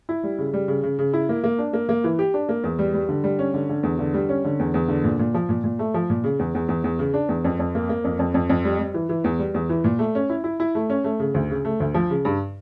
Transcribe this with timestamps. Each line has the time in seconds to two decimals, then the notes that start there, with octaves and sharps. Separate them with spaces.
0.09 E4
0.23 G3
0.38 C#3
0.54 G3
0.68 C#3
0.83 C#3
0.99 C#3
1.14 E4
1.29 A#3
1.44 A#3
1.59 D4
1.73 A#3
1.89 A#3
2.04 E3
2.19 G4
2.34 D4
2.49 A#3
2.64 E2
2.79 G3
2.94 G3
3.09 D3
3.24 G3
3.39 C#4
3.54 D3
3.69 D3
3.83 E2
3.99 D3
4.14 G3
4.29 C#4
4.44 D3
4.59 E2
4.74 E2
4.88 D3
5.04 A#2
5.19 A#2
5.34 F3
5.49 A#2
5.64 A#2
5.79 A3
5.94 F3
6.10 A#2
6.24 C#3
6.39 E2
6.55 E2
6.69 E2
6.84 E2
6.99 C#3
7.14 D4
7.29 E2
7.44 F2
7.59 F2
7.75 A#3
7.89 A#3
8.04 F2
8.19 F2
8.34 F2
8.50 F2
8.65 G3
8.79 G3
8.94 E3
9.09 E3
9.24 E2
9.39 G3
9.54 E2
9.69 E3
9.84 A#2
9.99 A3
10.15 C#4
10.30 E4
10.44 E4
10.60 E4
10.75 A3
10.90 C#4
11.04 A3
11.20 C#3
11.34 D2
11.50 C#3
11.65 A3
11.80 D2
11.94 F3
12.10 C#3
12.25 G2